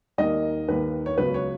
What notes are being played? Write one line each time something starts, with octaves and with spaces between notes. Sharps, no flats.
D#2 D#3 A#3 D#5
D#2 D#3 A#3 B4
C#5
C#2 C#3 F#3 B3 B4
C#5